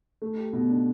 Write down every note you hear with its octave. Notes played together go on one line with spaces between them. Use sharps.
A3
G4
B2
D4